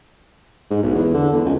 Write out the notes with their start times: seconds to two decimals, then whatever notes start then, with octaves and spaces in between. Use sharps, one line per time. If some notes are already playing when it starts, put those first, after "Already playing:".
0.70 G#2
0.83 B1
0.95 E2
1.14 D3
1.32 E2
1.45 C#2